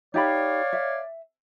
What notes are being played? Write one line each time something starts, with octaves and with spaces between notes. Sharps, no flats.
D#4 G4 C#5 D5 F5 B5
E5